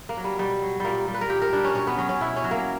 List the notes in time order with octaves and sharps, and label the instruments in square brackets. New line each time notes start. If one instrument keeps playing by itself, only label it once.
[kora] A#3
F#3
G3
B2 G3
F#3
A#2 G3 A#3
G3
B4
A#4
A#2 G4
A#4
G3 D4
C#4
B2 C#4
B3
F#3 C#4
C#4
B2 E4
C#4
F#3
A#3